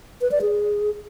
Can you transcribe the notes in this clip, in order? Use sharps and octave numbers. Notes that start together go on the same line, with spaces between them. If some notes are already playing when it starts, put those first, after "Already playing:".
B4
D5
G#4